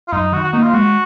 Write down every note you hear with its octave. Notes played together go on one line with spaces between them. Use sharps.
F4
F#2 D#4
D#3 F#4
F#4
A#3 D#4
F4
G#3 F#4